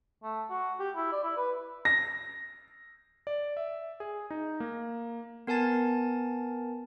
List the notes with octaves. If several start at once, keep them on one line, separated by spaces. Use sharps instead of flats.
A3
F#4
G4
E4
D5
E4
B4
A#6
D5
E5
G#4
D#4
A#3
B3 A#4 G#5 A5 A6